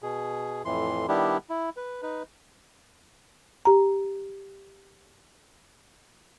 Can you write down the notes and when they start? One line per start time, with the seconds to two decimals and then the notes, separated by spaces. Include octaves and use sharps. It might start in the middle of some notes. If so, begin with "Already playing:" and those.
0.03 B2 G#4
0.65 F2 A2 E3 C6
1.08 D#3 G3 B3 D4 E4 G4
1.50 E4
1.77 B4
2.03 D#4 B4
3.65 G4 A#5